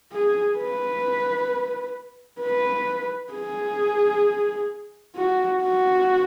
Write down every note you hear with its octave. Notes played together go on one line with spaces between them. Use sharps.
G#4
B4
B4
G#4
F#4
F#4